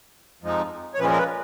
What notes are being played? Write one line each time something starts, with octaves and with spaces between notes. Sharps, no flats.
F2 F3 G#3 D#4
C#5
A#2 F3 G#3 C#4 B4
A#4
B4